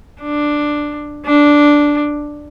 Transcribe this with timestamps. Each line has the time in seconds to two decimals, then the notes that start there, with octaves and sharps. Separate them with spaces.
0.22 D4
1.26 D4